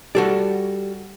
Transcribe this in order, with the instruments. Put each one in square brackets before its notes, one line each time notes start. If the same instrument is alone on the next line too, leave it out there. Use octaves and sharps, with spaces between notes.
[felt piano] G3 [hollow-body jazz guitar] F#4 A4 D5